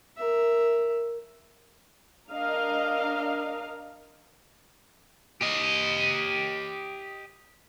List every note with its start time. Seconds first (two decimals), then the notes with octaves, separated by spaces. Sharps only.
0.17 A#4 E5
2.32 D4 A#4 D#5 F5
5.41 G4 D#5